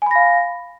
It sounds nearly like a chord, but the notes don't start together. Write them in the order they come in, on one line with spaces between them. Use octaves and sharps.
G#5 B5 A#6 F5